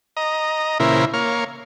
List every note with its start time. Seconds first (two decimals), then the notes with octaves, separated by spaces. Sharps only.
0.17 D#5 A#5
0.80 A#2 C#3 E3 E4 A#4 C5
1.14 A#3 C#5 F5